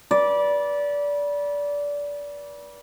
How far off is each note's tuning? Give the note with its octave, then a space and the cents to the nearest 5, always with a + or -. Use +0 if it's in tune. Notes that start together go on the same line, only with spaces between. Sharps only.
B4 -30 D5 -20